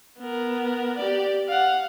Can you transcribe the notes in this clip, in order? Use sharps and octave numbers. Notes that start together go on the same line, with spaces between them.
B3 A#4
G4 D5
F5 F#5